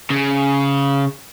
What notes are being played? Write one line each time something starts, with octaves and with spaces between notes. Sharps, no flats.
C#3